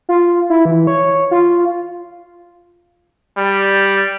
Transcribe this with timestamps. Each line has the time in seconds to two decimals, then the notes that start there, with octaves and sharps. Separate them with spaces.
0.09 F4
0.50 E4
0.65 E3
0.87 C#5
1.31 F4
3.38 G3